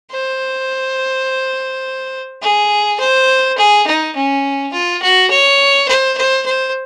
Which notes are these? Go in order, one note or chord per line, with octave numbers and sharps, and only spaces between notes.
C5
G#4
C5
G#4
D#4
C#4
F4
F#4
C#5
C5
C5
C5